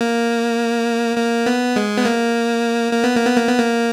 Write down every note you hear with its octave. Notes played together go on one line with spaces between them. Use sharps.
A#3
A#3
B3
G#3
B3
A#3
A#3
B3
A#3
B3
A#3
B3
A#3